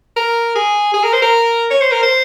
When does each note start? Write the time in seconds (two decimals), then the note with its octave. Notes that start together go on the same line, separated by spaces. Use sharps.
0.16 A#4
0.56 G#4
0.94 G#4
1.03 A#4
1.13 C5
1.22 A#4
1.71 C#5
1.81 C5
1.92 A#4
2.03 C5